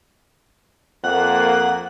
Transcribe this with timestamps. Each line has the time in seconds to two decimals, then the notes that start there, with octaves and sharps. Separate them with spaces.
1.04 F2 A#3 F#5